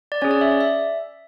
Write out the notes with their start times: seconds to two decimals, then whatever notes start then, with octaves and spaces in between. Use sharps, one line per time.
0.12 D5
0.22 C#4 G#4 C#5
0.31 D5
0.41 E5
0.51 D5
0.61 E5